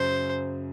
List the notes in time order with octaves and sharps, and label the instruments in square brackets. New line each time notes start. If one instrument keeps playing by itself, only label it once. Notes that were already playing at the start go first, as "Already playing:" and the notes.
Already playing: [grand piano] F#2 C#3 F#3 [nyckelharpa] C5